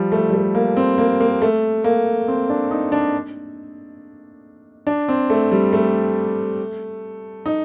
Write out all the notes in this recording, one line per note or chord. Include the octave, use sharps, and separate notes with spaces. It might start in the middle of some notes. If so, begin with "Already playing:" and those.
Already playing: F3 G3
A3
G3
A3
A#3
C4
A#3
A#3
A3
A#3
C4
D4
D#4
D4
D4
C4
A3
G3
A3
D#4